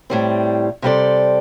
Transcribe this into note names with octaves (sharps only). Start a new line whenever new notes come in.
A2 G3 C4
C3 G3 C4 A4 D5